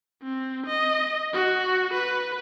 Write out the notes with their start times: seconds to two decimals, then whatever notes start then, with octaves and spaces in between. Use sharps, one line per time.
0.24 C4
0.66 D#5
1.34 F#4
1.94 B4